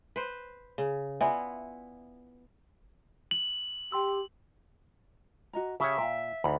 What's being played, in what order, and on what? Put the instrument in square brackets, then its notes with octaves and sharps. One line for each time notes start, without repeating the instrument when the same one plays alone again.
[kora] B4 C5
C#3
[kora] B3 E4 F4 [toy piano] D5 E5 G#5
[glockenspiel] F#7
[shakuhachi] G4 [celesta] G5 C6 E6
[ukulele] F#4 D#5 A#5
[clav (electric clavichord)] C#3 C#5 [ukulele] G4 [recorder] E5
[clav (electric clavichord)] A#2 [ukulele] F5 G5
[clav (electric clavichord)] D2 [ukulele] D#4 A#5 B5